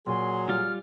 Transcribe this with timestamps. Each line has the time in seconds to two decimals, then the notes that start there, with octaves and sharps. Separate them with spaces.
0.07 A#2 F#3 G#4 C6
0.49 G3 F4 F6